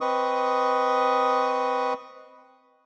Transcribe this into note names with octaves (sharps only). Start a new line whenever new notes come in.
C4 B4 D#5 C#6 D#6